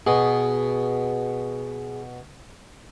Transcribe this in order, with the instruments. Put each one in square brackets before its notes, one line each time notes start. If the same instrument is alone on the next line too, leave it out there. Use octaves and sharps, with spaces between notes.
[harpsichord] B2 [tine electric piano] G#4